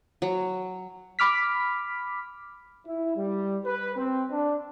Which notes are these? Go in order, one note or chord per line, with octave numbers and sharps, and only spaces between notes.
F#3
B5 D6 F6 B6
E4
G3
B4
C4
D4